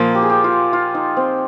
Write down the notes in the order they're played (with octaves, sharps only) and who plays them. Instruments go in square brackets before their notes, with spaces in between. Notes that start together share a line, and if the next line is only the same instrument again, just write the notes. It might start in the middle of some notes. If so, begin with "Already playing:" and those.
Already playing: [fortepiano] A#2 F3 A#3
[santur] G4
G#4
G4
F4
F4
D#4
C4